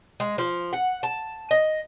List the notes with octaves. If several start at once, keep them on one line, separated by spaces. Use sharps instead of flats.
G#3
F3
F#5
A5
D#5